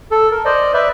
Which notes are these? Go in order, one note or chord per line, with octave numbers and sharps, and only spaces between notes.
A4
A#4
C5 D5 D#5
B4 D5 E5